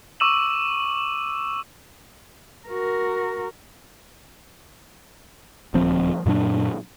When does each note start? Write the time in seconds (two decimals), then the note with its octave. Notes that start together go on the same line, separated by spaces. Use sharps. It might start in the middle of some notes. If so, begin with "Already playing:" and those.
0.20 C#6 D6 E6 D#7 E7 F#7
2.68 F#4 A#4
5.74 D#1 D2 F3 C4
6.26 F#2 A#2 F#3 D4